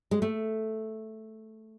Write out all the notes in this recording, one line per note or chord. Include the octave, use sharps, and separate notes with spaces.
G#3
A3